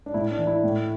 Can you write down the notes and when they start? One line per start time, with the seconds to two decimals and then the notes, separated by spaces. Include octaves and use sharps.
0.06 D4
0.14 A2 E4
0.31 D4
0.39 E3
0.47 E4
0.63 A2